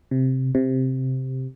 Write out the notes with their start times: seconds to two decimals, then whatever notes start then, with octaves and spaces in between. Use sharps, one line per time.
0.11 C3
0.55 C3